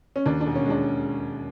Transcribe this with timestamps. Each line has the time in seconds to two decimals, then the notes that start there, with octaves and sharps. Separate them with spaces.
0.16 C#4
0.26 D#2 D4
0.41 D4
0.46 E1
0.55 C#4
0.65 G#3 D4